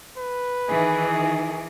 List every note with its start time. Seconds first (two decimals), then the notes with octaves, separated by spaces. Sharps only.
0.18 B4
0.68 D#3 E3 G#4